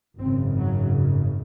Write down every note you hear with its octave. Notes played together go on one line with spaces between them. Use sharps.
G#1 F#2 C#3 C4
F#3